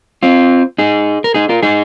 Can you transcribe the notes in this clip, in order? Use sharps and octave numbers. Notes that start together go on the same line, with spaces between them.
C4 F4
D#4 G#4
A#4
D#4 G#4
F4 A#4
D#4 G#4